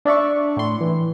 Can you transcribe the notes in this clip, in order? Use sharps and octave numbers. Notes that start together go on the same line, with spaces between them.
D4 D5 E5 C#6
A2 C6
E3